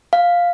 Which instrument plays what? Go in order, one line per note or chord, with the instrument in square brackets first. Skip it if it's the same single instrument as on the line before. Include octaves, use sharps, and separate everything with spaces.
[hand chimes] F5